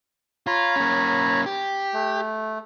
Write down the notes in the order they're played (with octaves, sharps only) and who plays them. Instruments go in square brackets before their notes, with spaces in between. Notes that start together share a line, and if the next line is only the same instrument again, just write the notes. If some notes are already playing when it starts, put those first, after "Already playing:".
[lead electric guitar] F4 [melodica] C#5 A#5 B5
[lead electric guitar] A#3 C#4
G4
[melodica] A3